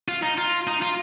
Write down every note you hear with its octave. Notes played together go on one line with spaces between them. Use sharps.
F4
D#4
F4
D#4
F4